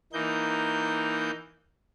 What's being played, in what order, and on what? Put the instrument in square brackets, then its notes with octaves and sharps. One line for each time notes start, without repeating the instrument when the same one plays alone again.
[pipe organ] E3 A#3 D#4 G6